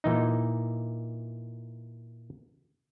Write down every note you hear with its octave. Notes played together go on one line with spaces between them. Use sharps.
A#2 E3 D#4